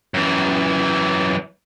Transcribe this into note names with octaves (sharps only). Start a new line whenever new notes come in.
F#2 E3